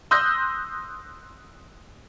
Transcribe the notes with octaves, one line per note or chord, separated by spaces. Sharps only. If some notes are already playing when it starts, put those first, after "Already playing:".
C6 D#6 E6 F#6 G6 A#6